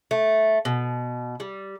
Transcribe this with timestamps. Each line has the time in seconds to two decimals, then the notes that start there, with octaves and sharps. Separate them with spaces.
0.11 A3
0.65 B2
1.40 G3